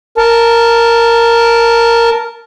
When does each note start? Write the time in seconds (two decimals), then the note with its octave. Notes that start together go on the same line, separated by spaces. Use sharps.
0.17 A#4 A5